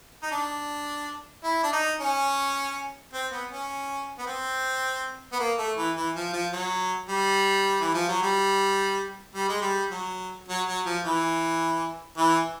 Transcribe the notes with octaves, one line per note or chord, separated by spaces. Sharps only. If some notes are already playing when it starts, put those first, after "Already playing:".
D#4
D4
E4
D4
D#4
C#4
C4
B3
C#4
B3
C4
B3
A#3
A3
E3
E3
F3
F3
F#3
G3
E3
F3
F#3
G3
G3
G#3
G3
F#3
F#3
F#3
F3
E3
E3